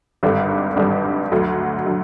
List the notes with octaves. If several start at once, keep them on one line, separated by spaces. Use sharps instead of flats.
G#1 G2 D3 G3
G#1 G2 D3 G3
D2 D3 F#3
D3 F#3